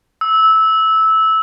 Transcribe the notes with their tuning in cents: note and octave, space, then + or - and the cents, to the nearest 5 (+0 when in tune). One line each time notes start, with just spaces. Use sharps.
E6 -15